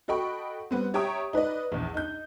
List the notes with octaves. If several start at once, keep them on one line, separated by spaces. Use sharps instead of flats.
F#4 A4 D#5 G5 B5 C#6
G3 B3 C4
G4 C#5 E5 G5 A#5 D#6
D#4 B4 D5 D#5
A#1 E2
D#4 G6